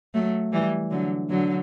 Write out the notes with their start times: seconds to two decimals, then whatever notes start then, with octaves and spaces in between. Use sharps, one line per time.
0.14 F#3 A3
0.52 E3 G3
0.91 D3 F#3
1.29 D3 F#3